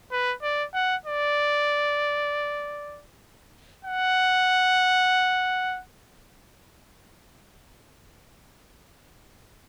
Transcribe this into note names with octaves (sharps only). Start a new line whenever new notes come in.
B4
D5
F#5
D5
F#5